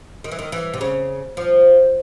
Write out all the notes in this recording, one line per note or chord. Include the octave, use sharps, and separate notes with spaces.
D#3
E3
D#3
E3
C3
C#3
F3